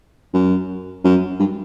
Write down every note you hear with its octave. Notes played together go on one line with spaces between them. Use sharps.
F#2
F#2
G2